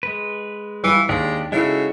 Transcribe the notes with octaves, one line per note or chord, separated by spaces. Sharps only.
G#3 B4
E3 G3 E4 F4
D#2 G#3 D4 G4 D5
C#3 G#3 D#4 E4 F#4 A4